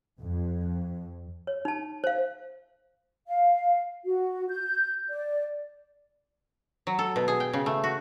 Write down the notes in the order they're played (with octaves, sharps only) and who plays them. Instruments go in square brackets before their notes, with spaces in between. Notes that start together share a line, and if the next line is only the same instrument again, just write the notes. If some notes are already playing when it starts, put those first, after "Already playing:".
[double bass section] F2
[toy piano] C#5
D#4 A5
C5 F5
[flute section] F5
F#4
G6
D5
[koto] F#3
A4
B2
G#4
G5
C#3
A3
F#4